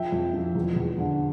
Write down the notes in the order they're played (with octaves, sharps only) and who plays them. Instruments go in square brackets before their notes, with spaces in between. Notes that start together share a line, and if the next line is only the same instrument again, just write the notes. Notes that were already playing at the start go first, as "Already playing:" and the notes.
Already playing: [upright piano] F3 E5 G5
F2
F3
E2
E2
D3